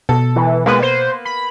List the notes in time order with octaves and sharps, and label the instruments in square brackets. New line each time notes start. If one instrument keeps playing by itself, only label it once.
[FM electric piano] B2 [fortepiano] A4
[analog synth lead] E3
[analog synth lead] G#3 [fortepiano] A#3 B3 B4
[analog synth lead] C5
B5